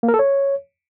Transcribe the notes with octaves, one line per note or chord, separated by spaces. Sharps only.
A#3
A#4
A4
C#5